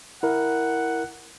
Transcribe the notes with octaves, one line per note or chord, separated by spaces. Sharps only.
E4 A#4 F#5